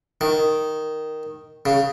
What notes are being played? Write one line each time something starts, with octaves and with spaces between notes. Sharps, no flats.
D#3
C#3